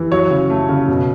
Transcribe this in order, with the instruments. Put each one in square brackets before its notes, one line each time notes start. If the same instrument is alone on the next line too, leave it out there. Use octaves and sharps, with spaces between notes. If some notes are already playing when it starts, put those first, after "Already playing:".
Already playing: [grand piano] E3
F#3 C#5
C#3
A3
C#3
B2